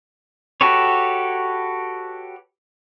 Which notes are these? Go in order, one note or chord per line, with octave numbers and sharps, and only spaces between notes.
F#4 G4 A4 B4 C#5